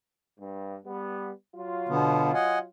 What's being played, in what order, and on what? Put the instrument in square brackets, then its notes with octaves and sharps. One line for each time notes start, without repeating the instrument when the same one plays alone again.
[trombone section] G2
G3 B3
F#3 F4
[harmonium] B2 D3 B3
D#5 F#5 G#5